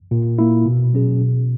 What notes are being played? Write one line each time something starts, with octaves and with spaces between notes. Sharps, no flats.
A#2
A#3 E4
B2
F#3 C#4 G#4
B2